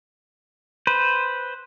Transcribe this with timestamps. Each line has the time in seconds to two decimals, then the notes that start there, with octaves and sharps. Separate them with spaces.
0.87 B4 C5